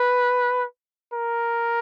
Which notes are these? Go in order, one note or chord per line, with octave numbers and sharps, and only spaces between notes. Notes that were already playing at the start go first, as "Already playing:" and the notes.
Already playing: B4
A#4